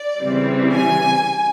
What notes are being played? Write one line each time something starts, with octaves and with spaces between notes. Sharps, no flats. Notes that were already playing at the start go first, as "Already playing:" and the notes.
Already playing: D5
C#3 E3 G3 C4
G#5